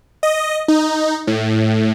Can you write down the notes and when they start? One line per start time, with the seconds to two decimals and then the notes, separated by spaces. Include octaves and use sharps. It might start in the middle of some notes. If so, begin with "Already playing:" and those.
0.23 D#5
0.68 D#4
1.27 A2